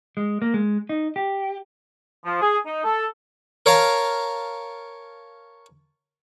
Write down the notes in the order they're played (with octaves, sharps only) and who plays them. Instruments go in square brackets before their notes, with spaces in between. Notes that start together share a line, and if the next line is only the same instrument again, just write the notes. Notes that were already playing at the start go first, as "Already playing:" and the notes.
[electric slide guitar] G#3
A#3
G#3
D#4
G4
[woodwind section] F3
G#4
D#4
A4
[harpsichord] A#4 C#5 F5 A5 A#5